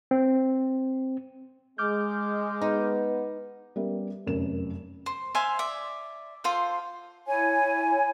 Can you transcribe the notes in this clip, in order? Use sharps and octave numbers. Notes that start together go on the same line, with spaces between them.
C4
G#3 D6 F6 G6
B3 D#4
G3 B3 C#4 A#4 E5
F1 F#2 A#4 E7
C5
C5 E5 F5 G#5
D5 E5
F4 A4 C5 F5
E4 C#5 G#5